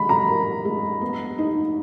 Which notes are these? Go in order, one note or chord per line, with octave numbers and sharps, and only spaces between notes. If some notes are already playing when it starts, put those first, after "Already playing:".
Already playing: G#3 B5
A#5
A#4
G#3
B3
D#4